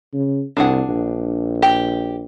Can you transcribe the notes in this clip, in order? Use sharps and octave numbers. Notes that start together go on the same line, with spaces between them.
C#3
C2 D4 G#4 F#5
A#1
G4